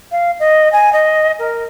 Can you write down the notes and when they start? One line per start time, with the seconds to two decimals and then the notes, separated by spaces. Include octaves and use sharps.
0.12 F5
0.40 D#5
0.73 G#5
0.93 D#5
1.39 A#4